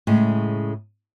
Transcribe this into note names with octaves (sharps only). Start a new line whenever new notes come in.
A2 C#3 G#3